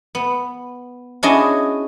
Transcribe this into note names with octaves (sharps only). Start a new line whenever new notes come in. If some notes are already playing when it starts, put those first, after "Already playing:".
B3
C#4 D4 E4 F#4 G#4 D#5